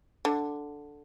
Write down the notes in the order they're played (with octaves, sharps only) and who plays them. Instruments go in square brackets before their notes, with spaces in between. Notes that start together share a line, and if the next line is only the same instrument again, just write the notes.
[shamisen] D3